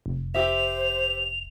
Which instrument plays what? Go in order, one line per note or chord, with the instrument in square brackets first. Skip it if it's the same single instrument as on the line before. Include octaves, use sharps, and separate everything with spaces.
[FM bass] F1
[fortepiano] G4 E5 [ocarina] C5 [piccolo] F7